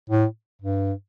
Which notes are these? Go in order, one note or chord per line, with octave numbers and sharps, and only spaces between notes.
A2
G2